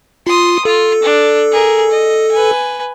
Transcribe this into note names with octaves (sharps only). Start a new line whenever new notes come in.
F4 C6 D#6
F4 A4
D4
G#4 A#4
D#5
B4 G#5